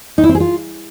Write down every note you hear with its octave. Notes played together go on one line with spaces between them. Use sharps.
D#4
E4
C4
G#4
F4